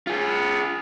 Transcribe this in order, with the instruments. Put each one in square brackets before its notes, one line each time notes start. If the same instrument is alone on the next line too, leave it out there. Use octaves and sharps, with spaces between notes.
[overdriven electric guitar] F4 G#4